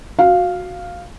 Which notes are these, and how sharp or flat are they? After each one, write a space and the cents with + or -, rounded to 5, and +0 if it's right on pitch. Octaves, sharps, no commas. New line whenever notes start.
F#4 -15 F5 +0